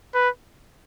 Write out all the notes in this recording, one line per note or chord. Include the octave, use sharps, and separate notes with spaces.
B4